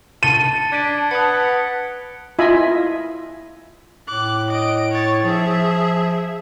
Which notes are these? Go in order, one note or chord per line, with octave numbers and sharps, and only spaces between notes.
A5 A6 C#7 D#7 G7
D4 G#6 B6 D7
B4 F#5 D#6 C#7
E4 F4 D#5 E5 G#5 B5
A2 D6 F#6
D#5 D7
C#5 A6
F3 G#4 E5